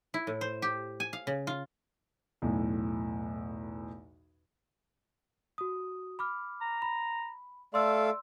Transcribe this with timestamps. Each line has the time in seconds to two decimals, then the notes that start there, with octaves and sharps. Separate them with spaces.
0.14 E4
0.27 A2
0.41 C5
0.62 G4
1.00 G#5
1.13 F5
1.27 C#3
1.47 F4
2.42 B1 E2 A2
5.58 F#4 D#6
6.19 B5 D6 F6
6.61 A#5
6.82 B5
7.74 A3 A4 D5 F5 C6 E6